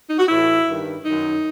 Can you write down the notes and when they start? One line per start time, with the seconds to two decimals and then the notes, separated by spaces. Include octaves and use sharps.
0.10 D#4
0.19 F#4
0.28 A2 E3 E4
0.66 G2 D#3
1.04 F#2 D#3 D#4